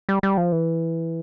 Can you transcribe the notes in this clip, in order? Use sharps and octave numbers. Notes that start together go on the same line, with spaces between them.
G3
G3
F3
E3